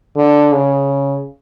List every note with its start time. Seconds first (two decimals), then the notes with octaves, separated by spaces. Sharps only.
0.17 D3
0.53 C#3